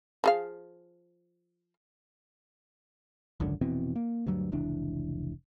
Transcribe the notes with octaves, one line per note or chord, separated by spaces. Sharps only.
F3 G#4 F5
G#1 C#2 F#2 D3
F1 B2 E3 C4
A#3
D2 G2 F#3
F1 C#2 E3 D4